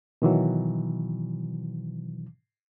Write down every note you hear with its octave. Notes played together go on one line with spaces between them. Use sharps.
B2 D#3 E3 F#3